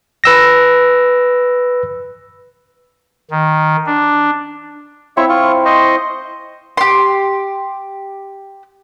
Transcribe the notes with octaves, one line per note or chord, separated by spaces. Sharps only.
B4 E6 A#6
D#3
D4
C4 E4 C#5 E5 F5 C#6
F4 C#6
C5 D#5 C#6
G4 C6